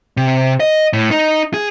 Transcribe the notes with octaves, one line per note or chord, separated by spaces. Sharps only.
C3
D#5
A2
D#4
G#4